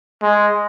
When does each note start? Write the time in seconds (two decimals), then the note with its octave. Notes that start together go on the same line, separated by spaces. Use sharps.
0.22 G#3